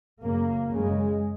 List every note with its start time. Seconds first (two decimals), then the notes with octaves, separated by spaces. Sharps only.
0.21 F#2 C#3 A#3
0.70 F#2 C#3 G#3